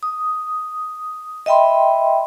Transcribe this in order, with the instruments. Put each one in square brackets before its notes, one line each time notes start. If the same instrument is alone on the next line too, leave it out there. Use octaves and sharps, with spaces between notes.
[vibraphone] D#6
D#5 E5 G5 B5 C6